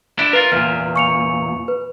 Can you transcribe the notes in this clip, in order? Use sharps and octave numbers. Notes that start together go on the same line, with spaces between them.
D4 E4
F4 A#4 B4
E2 A#2 F6
C#6 C#7 F7
B4